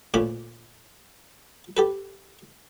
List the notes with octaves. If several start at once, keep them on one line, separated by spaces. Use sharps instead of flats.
D2 A#2 C#4 B5
G4 A4 B4